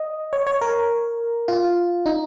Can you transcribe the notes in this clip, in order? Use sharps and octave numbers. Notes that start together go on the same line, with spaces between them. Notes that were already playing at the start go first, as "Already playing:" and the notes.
Already playing: D#5
C#5
C#5
A#4
F4
D#4